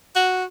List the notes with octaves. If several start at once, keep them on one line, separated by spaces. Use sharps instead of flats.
F#4